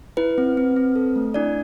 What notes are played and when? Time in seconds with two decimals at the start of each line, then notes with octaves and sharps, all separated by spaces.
0.17 E4 B4
0.38 C4
0.57 C4
0.76 C4
0.95 A4
1.16 A3
1.34 D4 E4 D5